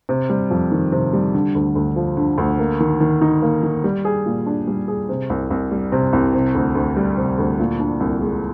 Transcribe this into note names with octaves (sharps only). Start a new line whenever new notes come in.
C3
G3
F2
D#3
C3
G3
D3
D2
D2
F3
D3
D2
A#3
D#3
D#3
D#4
A#3
D#3
G3
G#4
A#2
D4
G3
G#4
C3
C2
C2
G3
C3
C2
C3
D2
D2
G3
C3
D2
A#2
D4
C2
G#3